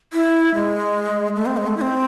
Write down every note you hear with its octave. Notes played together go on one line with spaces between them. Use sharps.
E4
G#3
A3
C4
G#3
A3
E4
C4